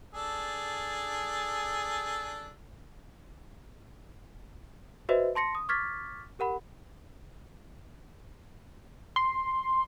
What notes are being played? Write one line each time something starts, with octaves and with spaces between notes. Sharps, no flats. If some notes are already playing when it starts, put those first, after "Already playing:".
D4 G#4 A4
F#4 B4 C5 D#5 E5
A5 C6 A#6 C#7
D#6
C#6 D6 F6 G#6 A6 B6
G4 A#4 F#5 B5
C6